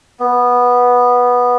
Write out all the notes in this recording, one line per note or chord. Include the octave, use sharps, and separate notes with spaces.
B3